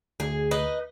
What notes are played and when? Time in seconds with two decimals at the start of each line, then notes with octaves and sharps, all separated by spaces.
0.20 D2 G#4
0.51 D#4 B4 D#5